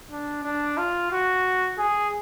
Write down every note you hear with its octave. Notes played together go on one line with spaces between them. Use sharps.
D4
D4
F4
F#4
G#4